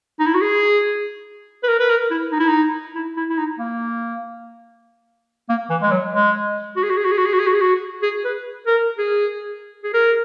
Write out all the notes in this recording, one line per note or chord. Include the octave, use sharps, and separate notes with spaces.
D#4
E4
F#4
G#4
B4
A#4
B4
A#4
E4
D#4
E4
D#4
E4
E4
E4
D#4
A#3
A#3
E3
G#3
F#3
G#3
F#4
G#4
F#4
G#4
F#4
G#4
F#4
G#4
F#4
G#4
F#4
G#4
F#4
G#4
B4
A#4
G#4
G#4
A#4